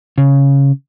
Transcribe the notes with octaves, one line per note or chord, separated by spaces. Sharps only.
C#3